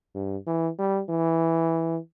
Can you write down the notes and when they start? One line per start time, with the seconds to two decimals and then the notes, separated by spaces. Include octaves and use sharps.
0.15 G2
0.47 E3
0.79 G3
1.10 E3